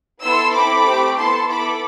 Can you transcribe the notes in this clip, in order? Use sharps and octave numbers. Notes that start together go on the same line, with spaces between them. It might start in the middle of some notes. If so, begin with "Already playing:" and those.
B3 E4 A4 C6 E6
C4 E4 A4 B5 D6
A3 C4 G4
B3 E4 A4 A5 C6
B3 E4 A4 B5 D6